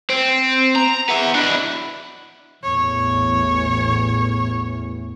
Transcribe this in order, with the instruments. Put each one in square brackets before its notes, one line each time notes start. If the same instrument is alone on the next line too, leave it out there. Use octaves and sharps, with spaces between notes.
[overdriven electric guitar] C4
A#5
B3 E5
D4 E4
[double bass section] A1 E2 [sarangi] C#5